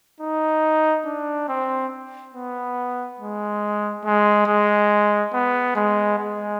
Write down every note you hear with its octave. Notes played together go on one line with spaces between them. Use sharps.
D#4
D4
C4
B3
G#3
G#3
G#3
B3
G#3
G#3